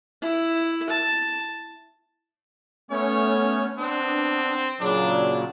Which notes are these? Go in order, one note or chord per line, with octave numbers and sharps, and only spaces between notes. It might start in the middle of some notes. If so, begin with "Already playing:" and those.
E4
A5
A3 B3 C#4 C#5
B3 C4 D4
A#2 C#3 F#3 D4